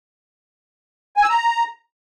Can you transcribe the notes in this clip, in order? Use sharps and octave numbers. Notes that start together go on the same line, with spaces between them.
G#5
E6
A#5